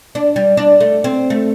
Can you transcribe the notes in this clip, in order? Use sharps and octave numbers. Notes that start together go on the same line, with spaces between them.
D4
G3
D4
A3
C4
A3